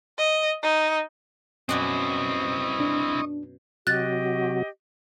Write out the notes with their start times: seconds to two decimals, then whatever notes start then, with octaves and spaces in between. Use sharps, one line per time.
0.18 D#5
0.63 D#4
1.69 F#2 B2 C4 E4 D5 D#5 C#6 D#6
2.80 D4
3.87 C3 F#3 F#4 G4 D#5 F#6 A6